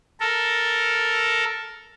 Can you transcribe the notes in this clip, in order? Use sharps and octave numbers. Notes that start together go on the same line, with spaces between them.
A4 A#4